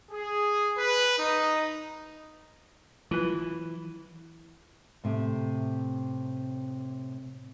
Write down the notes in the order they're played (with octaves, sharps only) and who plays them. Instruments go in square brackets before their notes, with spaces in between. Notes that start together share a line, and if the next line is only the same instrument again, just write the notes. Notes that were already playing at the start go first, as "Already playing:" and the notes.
[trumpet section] G#4
B4
D#4
[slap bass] E3 [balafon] F#3 F4 B4
[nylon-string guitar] A2 C3